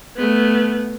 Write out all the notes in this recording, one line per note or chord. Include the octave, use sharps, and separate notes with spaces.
A3 B3